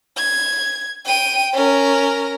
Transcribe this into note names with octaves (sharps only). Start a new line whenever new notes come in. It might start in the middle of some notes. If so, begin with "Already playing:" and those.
G#6
G5 D#7
C#4 A#4